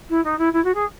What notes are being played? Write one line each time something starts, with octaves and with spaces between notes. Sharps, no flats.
E4
D#4
E4
E4
F#4
G#4